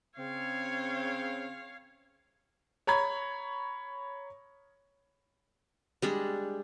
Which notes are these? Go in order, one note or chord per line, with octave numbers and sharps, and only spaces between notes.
C#3 C4 C#5 F5
C#5 A#5 B5 G#6
G3 G#3 D4